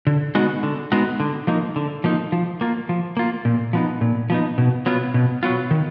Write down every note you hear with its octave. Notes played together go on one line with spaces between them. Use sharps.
D3
G#3 B3 D#4 F#4
D3
G#3 B3 D#4 F#4
D3
F3 A#3 D#4
D3
F3 A#3 D#4
F3
A#3 F4
F3
A#3 F4
A#2
F3 B3 D#4
A#2
F3 B3 D#4
B2
F#3 B3 F4
B2
F#3 B3 F4
D#3